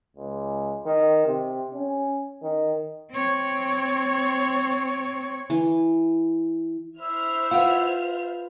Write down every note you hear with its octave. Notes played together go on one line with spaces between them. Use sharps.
C#2
D#3
C3
C#4
D#3
C4 C#5
E3
E4 C5 E5 F6
F4 B4 F5 F#5